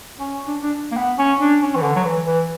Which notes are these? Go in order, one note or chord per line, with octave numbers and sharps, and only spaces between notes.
C#4
D4
D4
A#3
B3
C#4
D4
C#4
E3
D3
F#3
E3
E3